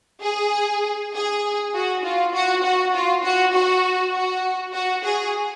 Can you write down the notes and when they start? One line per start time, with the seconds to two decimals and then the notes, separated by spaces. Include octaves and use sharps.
0.23 G#4
1.14 G#4
1.74 F#4
2.04 F4
2.34 F#4
2.64 F#4
2.94 F4
3.23 F#4
3.54 F#4
4.14 F#4
4.74 F#4
5.04 G#4